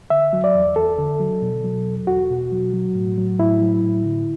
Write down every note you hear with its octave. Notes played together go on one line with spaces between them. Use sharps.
D3 E5
F#3
D5
E2
E2 A4
D3
F#3
B2
F#3
E2
E2 F#4
B2
F#3
F#3
A2
F#3
A2 E4
F#3
A2
D3